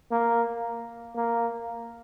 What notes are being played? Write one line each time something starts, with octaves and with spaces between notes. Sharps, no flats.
A#3
A#3